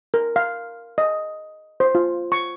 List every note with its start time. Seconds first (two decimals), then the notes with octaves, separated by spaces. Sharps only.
0.14 A#4
0.36 F5
0.98 D#5
1.80 C5
1.95 F4
2.32 C#6